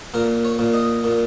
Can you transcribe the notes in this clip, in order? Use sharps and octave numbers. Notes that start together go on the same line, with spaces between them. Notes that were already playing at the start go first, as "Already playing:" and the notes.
A#2 A#4
C#5
A#2
D#5
A#2